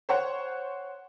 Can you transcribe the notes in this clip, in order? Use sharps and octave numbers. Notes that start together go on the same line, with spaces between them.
C5 C#5 F#5